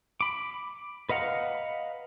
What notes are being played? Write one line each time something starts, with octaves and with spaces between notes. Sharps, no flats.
B5 D6
B4 D#5 F5 F#5 A#5